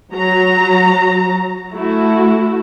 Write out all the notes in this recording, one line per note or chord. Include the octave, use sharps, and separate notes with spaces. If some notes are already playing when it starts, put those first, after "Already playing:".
F#3 A#5
A3 E4 F#4